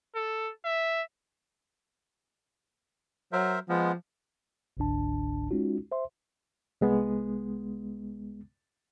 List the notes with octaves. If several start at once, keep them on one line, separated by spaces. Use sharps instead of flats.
A4
E5
F#3 A#4 C5 E5
F3 G#3 B3
G1 C#2 G#2 D3 D4 A5
G#3 C#4 D#4 F4 F#4
C5 E5 C6
C2 G#3 B3